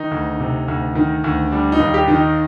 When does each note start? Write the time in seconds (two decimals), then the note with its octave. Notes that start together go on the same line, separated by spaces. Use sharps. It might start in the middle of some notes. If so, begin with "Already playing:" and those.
Already playing: D#3 D#4
0.11 D2
0.40 C3
0.68 D2
0.95 D#3
1.24 D2
1.52 G3 D4
1.72 D#4
1.79 D#2
1.94 G4
2.08 D#3
2.15 D#4